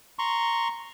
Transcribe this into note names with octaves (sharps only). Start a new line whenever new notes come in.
A#5 C6 C#6